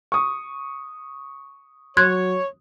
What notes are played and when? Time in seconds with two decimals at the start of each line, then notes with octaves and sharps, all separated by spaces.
0.12 C#6 D#6
1.97 F#3 C#5 C6 F#6 G#6